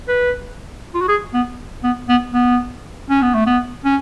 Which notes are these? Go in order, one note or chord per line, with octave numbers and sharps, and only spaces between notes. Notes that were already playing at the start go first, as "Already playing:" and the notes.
B4
F4
F#4
G#4
B3
B3
B3
B3
C#4
B3
A3
B3
C#4